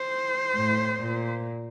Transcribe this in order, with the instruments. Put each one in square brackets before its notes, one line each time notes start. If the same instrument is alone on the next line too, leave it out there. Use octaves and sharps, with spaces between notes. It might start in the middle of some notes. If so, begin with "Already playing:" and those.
Already playing: [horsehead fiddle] C5
[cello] A2
A#2